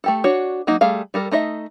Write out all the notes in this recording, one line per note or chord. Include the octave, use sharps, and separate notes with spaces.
A3 G4 A4
D4 F#4 C#5
F#3 A#3 D#4
G3 A3 G#4 F5
G3 A4 A#4
A3 D#4 D#5 E5